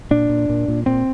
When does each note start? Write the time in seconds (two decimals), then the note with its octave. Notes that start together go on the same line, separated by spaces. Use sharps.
0.11 A#2 D4
0.29 A#2
0.49 A#2
0.68 A#2
0.86 A#2 C4